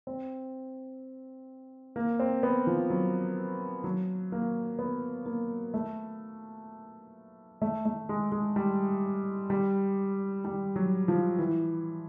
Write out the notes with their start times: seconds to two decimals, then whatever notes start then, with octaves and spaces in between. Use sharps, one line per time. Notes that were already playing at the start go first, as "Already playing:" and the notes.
0.07 C4
1.96 A#3
2.19 C4
2.43 B3
2.67 F3
2.90 F#3
3.84 F#3
4.32 A#3
4.79 B3
5.26 A#3
5.74 A3
7.62 A3
7.85 A3
8.09 G#3
8.32 G#3
8.56 G3
9.50 G3
10.45 G3
10.76 F#3
11.08 F3
11.38 E3